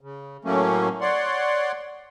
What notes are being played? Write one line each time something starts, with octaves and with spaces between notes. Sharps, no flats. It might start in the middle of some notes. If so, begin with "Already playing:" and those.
C#3
A2 F#3 A3 A#3 C#4
C#5 D5 F#5 C6